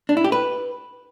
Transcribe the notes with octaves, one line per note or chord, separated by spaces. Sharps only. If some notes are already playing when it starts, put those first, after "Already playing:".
D4
E4
G4
B4